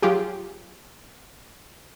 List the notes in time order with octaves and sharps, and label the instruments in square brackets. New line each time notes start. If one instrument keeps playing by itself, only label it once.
[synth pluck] F#3 F4 G4 G#4